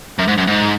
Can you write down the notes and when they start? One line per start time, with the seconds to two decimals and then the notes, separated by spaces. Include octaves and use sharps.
0.19 F#2
0.28 G#2
0.38 F#2
0.48 G#2